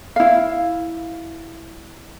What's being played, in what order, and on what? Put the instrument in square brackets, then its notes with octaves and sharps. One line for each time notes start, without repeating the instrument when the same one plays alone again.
[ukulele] E4 F5